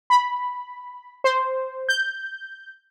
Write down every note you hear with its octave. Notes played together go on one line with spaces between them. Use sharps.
B5
C5
G6